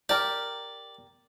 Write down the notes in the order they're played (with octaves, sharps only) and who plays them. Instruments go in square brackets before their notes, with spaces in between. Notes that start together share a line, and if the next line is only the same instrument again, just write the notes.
[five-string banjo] G4 A#4 [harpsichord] D5